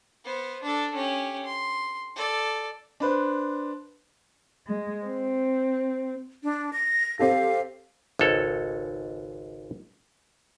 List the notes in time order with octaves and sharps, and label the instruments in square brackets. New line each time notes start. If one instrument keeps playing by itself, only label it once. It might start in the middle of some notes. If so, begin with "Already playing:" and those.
[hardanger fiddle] B3 C5
D4 A4
C#4 G4
C6
A4 D5
[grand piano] D4 B4 C5
[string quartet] G#3
C4
[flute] D4
A#6
[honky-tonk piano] C4 G4 A4 [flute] F5
[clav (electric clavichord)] G#1 C#2 A4 C#5